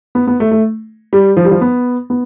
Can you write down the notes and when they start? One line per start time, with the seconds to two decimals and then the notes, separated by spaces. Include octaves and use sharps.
0.15 B3
0.27 B3
0.40 A3
0.51 A3
1.13 G3
1.37 F3
1.45 G3
1.51 F3
1.61 B3
2.10 B3